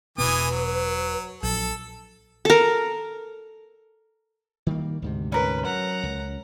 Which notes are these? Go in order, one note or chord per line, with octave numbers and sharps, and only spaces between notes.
E1 B2 E3 B3 B4 G#5 D#6
F#3
A#1 F#3 A4
A4 A#4
D#3 G3 A#3
D2 G#2 C3
C#4 A#4 B4
F#3 F#5 A#5
C#2